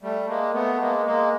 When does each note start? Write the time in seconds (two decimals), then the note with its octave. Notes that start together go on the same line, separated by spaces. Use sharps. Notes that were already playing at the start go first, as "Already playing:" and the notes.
0.02 G3 A3
0.28 G#3 A#3
0.54 A3 B3
0.80 G#3 A#3
1.05 G#3 A#3